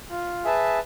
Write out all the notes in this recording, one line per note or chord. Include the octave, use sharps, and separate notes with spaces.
F4
G#4 B4 E5 A5